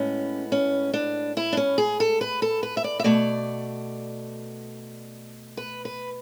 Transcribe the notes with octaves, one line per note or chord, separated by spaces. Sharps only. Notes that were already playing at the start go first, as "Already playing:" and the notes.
Already playing: A2 G#3 B3 C#4
C#4
D4
E4
D4
C#4
G#4
A4
B4
A4
B4
E5
D5
E5
B2 A3 D5
B4
B4